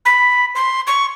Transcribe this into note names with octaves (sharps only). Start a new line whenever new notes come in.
B5
C6
C#6